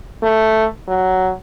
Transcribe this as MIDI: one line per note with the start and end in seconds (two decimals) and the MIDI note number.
0.23 0.66 57
0.88 1.31 54